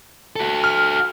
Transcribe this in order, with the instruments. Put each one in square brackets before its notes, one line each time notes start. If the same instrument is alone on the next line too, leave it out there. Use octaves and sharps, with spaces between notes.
[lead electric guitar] F#4 A4
[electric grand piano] F6